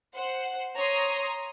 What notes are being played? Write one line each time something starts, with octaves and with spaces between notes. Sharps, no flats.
C5 F#5
C#5 A#5 C6 D#6